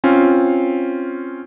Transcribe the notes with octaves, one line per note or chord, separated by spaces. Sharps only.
C4 C#4 F4